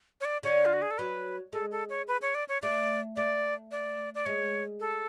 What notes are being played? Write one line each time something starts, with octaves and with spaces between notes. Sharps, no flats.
C#5
D5
D3 C#5
F4
F#4
G#4
A4
F#3 B4
G#3 A4
A4
C#5
B4
C#5
D5
C#5
A3 D5
A3 D5
D5
D5
G#3 C#5
A4